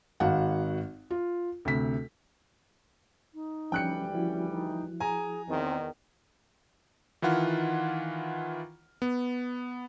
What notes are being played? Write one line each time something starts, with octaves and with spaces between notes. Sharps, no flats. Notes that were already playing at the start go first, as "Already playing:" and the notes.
G#1 F#4 F5 F#5
F4
D2 C3 B6
D#4
D2 E3 F3 G3 C#4 G5 F#6 C#7
F3 C#4 E4 F#4
D#4
G#4 G#5 A#5
E2 D#3 C4
D#3 E3 E4 F4 F#5 F6
B3